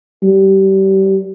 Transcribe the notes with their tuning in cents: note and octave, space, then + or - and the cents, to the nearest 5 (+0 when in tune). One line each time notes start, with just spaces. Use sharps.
G3 -25